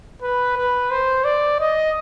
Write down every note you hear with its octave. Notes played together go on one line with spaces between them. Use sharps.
B4
B4
C5
D5
D#5